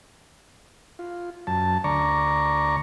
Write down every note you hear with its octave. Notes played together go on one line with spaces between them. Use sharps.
F4
F#2 A5
D2 D5 A#5 C#6